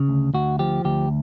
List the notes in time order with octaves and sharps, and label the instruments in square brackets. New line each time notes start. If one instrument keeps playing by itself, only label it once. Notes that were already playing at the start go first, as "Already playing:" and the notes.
Already playing: [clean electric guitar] C#3
D2
D2 F#4
F3 G4
D2 G4